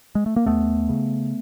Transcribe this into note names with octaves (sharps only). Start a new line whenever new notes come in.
G#3
A3
A#3
D#2 A3 B3
C#3